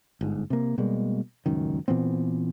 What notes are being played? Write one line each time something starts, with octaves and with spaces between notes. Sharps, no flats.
G1 G#2
C3 A#3
B2 G3 G#3 A#3
D#1 C#2 F#2 D#3
A#2 E3 B3 C4